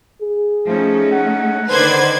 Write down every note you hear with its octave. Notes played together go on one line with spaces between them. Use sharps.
G#4
F3 A3 C#4 D#4
F#5
D3 D#3 B4 C5 D5 G#6